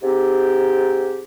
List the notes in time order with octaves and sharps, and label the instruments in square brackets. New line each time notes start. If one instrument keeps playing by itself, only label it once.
[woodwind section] G#2 C4 D#4 G4